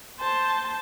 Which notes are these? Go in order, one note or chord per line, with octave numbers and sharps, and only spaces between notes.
C5 A5